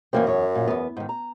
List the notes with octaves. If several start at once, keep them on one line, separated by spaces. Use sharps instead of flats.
F#2 E3 A#3 C4
E2 C#5
A#2
E2 B3
G#2 D#3
A#5